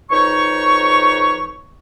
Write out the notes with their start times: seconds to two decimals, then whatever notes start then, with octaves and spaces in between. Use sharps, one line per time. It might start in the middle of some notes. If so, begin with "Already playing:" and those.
0.11 F2 D#4 B4 C#5 C#6